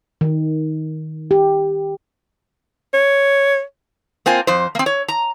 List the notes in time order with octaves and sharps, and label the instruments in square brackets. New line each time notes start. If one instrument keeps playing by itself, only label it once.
[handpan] D#3
G4
[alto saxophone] C#5
[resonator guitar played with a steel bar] A#3 C4 F4 G#5
F2 C5
A#3 C4
C#5
A#5